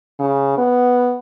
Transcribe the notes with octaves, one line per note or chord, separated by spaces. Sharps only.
C#3
B3